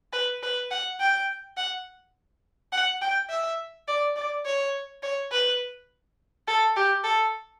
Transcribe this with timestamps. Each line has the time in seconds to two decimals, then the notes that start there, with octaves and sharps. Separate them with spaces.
0.13 B4
0.43 B4
0.71 F#5
1.00 G5
1.57 F#5
2.72 F#5
3.02 G5
3.30 E5
3.88 D5
4.16 D5
4.45 C#5
5.03 C#5
5.31 B4
6.48 A4
6.76 G4
7.04 A4